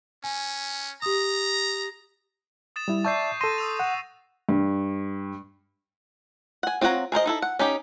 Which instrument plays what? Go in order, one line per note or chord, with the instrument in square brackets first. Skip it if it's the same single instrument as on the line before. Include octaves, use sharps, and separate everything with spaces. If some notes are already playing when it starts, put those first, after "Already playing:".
[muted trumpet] C#4 [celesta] G#5
[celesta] G4 D#6 [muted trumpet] A#5
[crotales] D#6 A6 E7
[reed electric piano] G3 E4
[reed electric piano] D5 E5 A5 [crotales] C#6 G6 C7
[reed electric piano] A4 C6 [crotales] A#6 D#7 E7
[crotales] D#6 E6 F7
[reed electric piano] F#5
[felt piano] G2
[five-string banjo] F#5 G#5
C4 F4 C#5 F#5 A#5
G#4 A#4 C5 D#5
D#4 E4 A4
F#5
C#4 D#4 G4